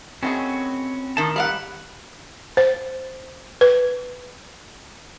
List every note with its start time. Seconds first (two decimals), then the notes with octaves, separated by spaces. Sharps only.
0.23 D#3 A3 C4 C#4 F#4 G#4 B5
1.17 A2 D#3 A5
1.36 G3 A#4 F5 F#5 B5
2.57 C5
3.61 B4